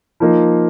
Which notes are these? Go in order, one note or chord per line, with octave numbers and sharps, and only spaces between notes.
F3 A#3 D#4